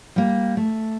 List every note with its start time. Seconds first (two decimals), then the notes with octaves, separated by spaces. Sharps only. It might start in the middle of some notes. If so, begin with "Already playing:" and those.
0.16 G3 A#3
0.57 A3